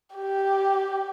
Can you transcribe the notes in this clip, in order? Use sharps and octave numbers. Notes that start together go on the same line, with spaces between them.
G4